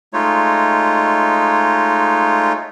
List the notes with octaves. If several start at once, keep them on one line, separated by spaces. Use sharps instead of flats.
G#3 A3 D#4 F4 C#5